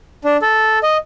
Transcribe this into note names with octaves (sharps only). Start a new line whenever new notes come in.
D4
A4
D#5